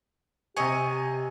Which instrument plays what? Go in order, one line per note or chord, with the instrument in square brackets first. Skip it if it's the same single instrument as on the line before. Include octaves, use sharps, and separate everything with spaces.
[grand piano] C3 G#5 [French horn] G4 [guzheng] C#5 D#5